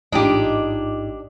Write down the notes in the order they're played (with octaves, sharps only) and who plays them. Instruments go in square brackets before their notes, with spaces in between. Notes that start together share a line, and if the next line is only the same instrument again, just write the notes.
[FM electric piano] A1 D#5 [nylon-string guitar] G#2 D#4 F4 [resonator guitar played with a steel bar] D4 G4